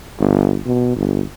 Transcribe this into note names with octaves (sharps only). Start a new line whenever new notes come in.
G1
B2
G1